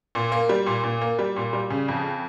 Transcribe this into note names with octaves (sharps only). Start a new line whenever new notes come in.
A#2
A#3
G3
A#2
A#2
A#3
G3
A#2
G3
C#3
F2